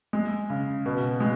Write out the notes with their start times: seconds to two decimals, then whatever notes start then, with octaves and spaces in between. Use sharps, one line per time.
0.13 G#3
0.50 C#3
0.86 B2
1.20 G#3